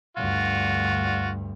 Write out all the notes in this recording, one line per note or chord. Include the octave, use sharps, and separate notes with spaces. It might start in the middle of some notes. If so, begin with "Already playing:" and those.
D2 G2 F4 F#4